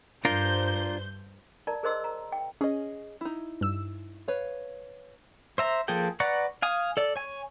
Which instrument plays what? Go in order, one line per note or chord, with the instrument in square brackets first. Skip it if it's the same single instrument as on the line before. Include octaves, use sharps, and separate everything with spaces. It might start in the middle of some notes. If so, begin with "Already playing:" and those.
[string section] G2 C5 G6 [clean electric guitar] D4 F4 A#4
[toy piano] A#4 D5 A5 A#5
G#4 A#4 C5 D#5 C6 E6
A#5
G5
[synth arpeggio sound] C#4 [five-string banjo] G#4 D#5
[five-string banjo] D#4 E4
[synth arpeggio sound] G2 E6
[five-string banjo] B4 C#5 F5
[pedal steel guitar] C5 E5 A#5
F3 A#3 G#4 A4 G5
B4 D5 F#5 A#5 C#6
F5 G#5 D#6
A4 D5
C#5 G#5